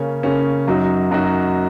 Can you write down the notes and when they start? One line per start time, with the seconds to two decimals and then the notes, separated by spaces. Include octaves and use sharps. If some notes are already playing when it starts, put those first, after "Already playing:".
Already playing: C#3 A#3 C#4
0.23 C#3 A#3 C#4
0.67 F#2 F#3 D#4 F#4
1.11 F#2 F#3 D#4 F#4